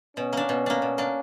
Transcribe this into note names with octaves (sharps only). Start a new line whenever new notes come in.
B2 C#4
A#3 D4
B2
A#3 D4
B2
A#3 D4